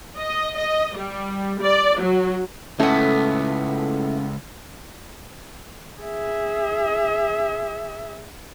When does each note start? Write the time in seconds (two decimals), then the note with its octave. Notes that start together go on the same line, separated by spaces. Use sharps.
0.19 D#5
0.57 D#5
0.97 G3
1.63 D5
2.01 F#3
2.80 C#2 A2 A3 B3 C#4 E4 A4
6.01 G#4 E5